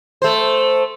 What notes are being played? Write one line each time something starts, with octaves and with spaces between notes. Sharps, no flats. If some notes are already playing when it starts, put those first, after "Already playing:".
A3 C5